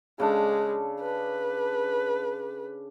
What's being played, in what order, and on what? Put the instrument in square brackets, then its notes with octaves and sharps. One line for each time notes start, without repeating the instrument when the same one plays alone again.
[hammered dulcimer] C#3 D4 A4 [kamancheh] G#3
[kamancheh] B4